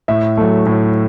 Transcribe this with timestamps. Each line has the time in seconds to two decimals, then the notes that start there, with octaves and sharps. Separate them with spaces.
0.08 A2 E5
0.37 F#3 A3
0.66 A2